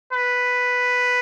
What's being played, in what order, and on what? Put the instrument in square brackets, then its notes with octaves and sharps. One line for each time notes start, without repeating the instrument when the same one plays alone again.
[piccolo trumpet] B4